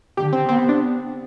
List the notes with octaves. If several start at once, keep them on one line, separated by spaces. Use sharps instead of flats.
D3 G4
C4
B3 C4
C4
D4